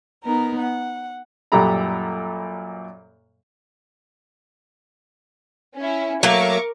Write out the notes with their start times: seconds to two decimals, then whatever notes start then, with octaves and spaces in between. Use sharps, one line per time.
0.23 B3 D#4 A#4
0.60 F#5
1.52 F#2 A#2 G3 A4 A#5 B5
5.77 C#4 E4
6.23 F#3 A3 A#3 A#4 C#6 D6